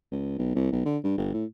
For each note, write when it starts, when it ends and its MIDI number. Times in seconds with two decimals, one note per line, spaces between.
0.12 0.37 37
0.38 0.51 35
0.55 0.71 36
0.72 0.81 35
0.85 0.98 50
1.04 1.15 43
1.17 1.31 31
1.33 1.45 45